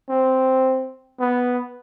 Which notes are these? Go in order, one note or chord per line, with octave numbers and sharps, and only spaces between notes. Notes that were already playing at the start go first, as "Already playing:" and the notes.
C4
B3